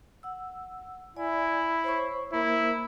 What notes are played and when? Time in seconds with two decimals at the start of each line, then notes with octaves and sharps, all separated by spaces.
0.23 F#5 E6
1.16 E4 D5 G#5
1.84 C5 C#5 C#6
2.33 A#3 E4 A#4 C5